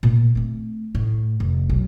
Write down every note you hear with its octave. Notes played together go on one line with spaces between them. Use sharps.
A#2
A3 C4
A2
F1
B1